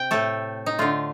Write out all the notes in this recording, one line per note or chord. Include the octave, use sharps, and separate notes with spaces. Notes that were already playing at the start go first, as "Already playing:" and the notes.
Already playing: C3 G5
A2 A3 A4
D#4
D3 A3 F4